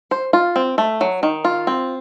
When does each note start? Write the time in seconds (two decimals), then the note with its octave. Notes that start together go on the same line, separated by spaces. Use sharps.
0.11 C5
0.33 F4
0.56 C4
0.78 A3
1.01 F#3
1.23 D#3
1.45 F4
1.67 C4